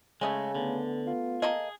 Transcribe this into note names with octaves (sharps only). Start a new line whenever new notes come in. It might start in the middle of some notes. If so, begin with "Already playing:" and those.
C#3 G#3 A3 C#4 D#5 G#5
D3 A3 B3
F4
A#3 G#4 A4 D#5